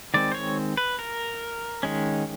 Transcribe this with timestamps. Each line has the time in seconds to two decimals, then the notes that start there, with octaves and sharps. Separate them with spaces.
0.14 D#3 G#3 C4 D5
0.32 C5
0.35 C#5
0.77 B4
0.99 A#4
1.83 D#3 G#3 C#4